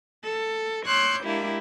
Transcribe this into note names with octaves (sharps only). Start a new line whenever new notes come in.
A4
C#5 C6 D6 E6 F#6 G6
G#3 A#3 D4 E4 G4